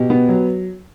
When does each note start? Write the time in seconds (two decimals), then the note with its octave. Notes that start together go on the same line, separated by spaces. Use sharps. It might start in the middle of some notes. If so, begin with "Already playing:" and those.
Already playing: B2 G4
0.10 B3
0.29 F#3